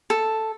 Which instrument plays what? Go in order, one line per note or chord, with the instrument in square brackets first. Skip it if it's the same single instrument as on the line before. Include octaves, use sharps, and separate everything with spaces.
[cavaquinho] A4